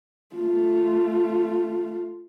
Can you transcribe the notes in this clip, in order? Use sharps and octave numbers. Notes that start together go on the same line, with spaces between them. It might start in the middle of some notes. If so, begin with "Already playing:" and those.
A3 F4